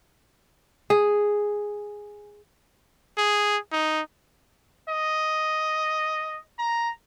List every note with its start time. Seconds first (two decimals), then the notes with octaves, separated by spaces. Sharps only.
0.90 G#4
3.18 G#4
3.72 D#4
4.89 D#5
6.59 A#5